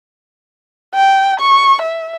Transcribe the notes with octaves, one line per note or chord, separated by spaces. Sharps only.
G5
C#6
E5